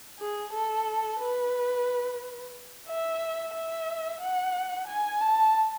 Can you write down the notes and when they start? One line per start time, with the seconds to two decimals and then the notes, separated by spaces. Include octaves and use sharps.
0.19 G#4
0.53 A4
1.20 B4
2.88 E5
3.54 E5
4.21 F#5
4.88 G#5
5.21 A5